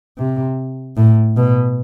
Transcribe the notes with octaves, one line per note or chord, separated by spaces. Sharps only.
C3
A2
B2